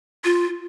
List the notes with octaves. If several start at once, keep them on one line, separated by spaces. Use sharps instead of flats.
F4